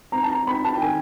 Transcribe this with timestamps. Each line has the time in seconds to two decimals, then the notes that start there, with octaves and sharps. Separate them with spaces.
0.12 C4 A#5
0.23 A5
0.30 A#5
0.47 C4 B5
0.64 A5
0.75 G5
0.82 D#3 G#5